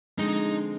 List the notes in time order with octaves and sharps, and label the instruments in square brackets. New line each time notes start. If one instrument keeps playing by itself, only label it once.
[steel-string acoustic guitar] D3 F3 G#3 C4 [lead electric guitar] D#4